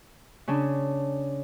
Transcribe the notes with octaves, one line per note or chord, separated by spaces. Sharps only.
C#3 C#4 D4